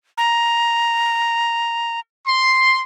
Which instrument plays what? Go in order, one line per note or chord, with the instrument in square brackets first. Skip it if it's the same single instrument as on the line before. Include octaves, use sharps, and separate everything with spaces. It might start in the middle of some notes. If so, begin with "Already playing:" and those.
[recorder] A#5
[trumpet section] C6